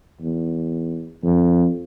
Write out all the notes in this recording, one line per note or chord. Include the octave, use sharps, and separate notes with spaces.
E2
F2